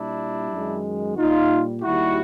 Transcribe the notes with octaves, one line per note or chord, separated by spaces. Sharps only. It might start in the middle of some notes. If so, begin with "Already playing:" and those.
Already playing: A#2 G3 D4 E4
F#2 D#3 G#3
A#2 G3 D#4 F4
D#2 D#3 G3 E4 F#4